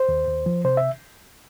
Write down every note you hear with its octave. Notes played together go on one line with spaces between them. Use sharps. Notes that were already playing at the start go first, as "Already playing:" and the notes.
Already playing: C5
D#2
D#2
F3
C3 C5
E5